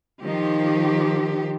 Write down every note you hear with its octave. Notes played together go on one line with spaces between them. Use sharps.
D#3 F3 G4